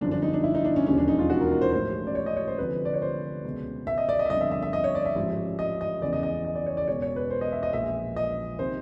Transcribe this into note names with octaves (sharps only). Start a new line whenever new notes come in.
G1 F#2 D3 F3 D4
D4
D#4
D4
E4
D#4
D4
C#4
E1 D#2 C#3 F3 C#4
D4
D#4
F4
F#4
A#4
A#4
C5
A1 A2 F3 C5
D5
C#5
D#5
C#5
C5
D2 C3 F3 B4
D5
C#5
C5
C#2 B2
E5
D#5
D5
D#5
E5
G1 F2 D3 D#5
E5
E5
E5
D#5
C#5
D5
E5
A1 G#2 F3
D#5
D#5
F#1 E2 C#3 E3 D5
D#5
D#5
D#5
D5
C#5
D5
E1 E2 B2 C#5
C#5
B4
C5
D#5
E5
D#5
A#1 A#2 F3 E5
D#5
C3 D#3 C5